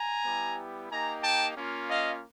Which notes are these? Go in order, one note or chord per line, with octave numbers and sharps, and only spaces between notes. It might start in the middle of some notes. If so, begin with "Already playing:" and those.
Already playing: G#5 A#5
G3 B3 E4 G4
A#3 D#4 G4 G#5 A#5
G5 A5
A#3 C#4 F4
D#5 F5